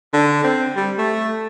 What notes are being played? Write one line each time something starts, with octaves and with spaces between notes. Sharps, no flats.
D3
C4
G3
A3